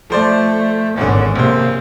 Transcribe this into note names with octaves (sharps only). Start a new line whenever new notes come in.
F3 A3 C5 D5
G#1 E2 D3 C#4
A#1 C3 A#3 C5